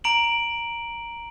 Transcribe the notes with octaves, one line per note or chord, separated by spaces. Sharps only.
A#5 D7 F#7